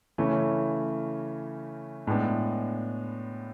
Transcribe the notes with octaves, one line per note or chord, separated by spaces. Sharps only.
C#3 E3 A3 C#4
A2 G#3 B3 D4